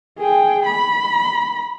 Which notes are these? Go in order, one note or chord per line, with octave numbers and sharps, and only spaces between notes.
G#4 G5
B5